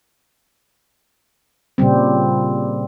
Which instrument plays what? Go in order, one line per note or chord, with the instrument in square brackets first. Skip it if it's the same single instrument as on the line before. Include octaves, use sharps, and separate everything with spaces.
[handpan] A#2 C#3 G3 C4